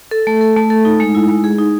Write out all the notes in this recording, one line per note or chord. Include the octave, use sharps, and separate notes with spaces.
A4
A3
A4
A3
A4
D#4
G#3
E4
G#3
G#4
D#4